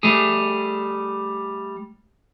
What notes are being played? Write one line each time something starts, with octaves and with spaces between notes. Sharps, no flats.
G3 A3 G#4